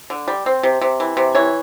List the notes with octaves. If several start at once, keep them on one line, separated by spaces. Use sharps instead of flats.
D3
G3
C4
C3
C3
E3
C3
E3 C#5